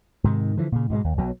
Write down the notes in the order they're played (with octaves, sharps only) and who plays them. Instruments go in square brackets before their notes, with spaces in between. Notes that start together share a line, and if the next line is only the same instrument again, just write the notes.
[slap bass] G#2 C3 D#3
D3 E3 F3
A#2 C#3
G#2 B2 G3 G#3
D#2
B1 B2 F#3